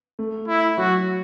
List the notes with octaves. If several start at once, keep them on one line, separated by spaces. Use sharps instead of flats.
A3
E4
F#3 F#4